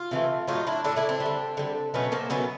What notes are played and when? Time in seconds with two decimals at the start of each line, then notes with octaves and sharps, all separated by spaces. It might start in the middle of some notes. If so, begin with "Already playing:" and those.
Already playing: F4
0.11 C3 E3 A3
0.47 A2 F#3 A3 D#4 F4
0.67 D4 E4
0.84 F#3 A3 D4 E4
0.89 A2
0.96 D4 E4
1.09 C4 D4
1.20 G3
1.26 D3
1.57 D3 G3
1.94 B2 F#3 A3 B3 C#4
2.12 A#3 C4
2.30 B2 F#3 A3 B3 C#4